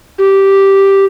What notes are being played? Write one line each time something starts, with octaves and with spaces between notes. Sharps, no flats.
G4